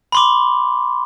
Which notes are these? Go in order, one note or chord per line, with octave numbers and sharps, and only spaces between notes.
B5 C6 D6